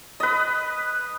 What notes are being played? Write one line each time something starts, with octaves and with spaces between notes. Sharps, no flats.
B4 D#5